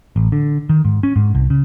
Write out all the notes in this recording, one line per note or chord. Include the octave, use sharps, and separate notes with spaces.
A1
D3
D#3
G#2
C#4
G#2
C2
C#3